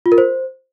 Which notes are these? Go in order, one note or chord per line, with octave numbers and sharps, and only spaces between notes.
F4
A#4
C5